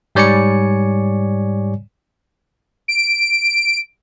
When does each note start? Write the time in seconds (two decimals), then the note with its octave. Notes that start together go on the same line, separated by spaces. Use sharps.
0.15 G#2 G3 C#5 D5 G#5 C#7
2.88 D7